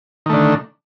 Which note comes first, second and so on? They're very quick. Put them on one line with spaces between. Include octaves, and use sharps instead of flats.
D#3 A3 D3